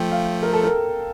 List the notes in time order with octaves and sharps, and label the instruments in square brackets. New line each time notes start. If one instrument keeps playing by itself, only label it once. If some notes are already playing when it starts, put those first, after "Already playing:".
Already playing: [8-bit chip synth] F3 A3 [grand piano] G5
[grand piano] F5
A#4
A4
A#4